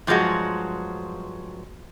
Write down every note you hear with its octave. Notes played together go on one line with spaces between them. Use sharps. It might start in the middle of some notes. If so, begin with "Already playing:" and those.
G2 F3 F#3 G#3 F#4